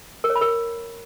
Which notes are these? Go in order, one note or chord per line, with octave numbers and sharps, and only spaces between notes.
A#4
C#5
B5
A#4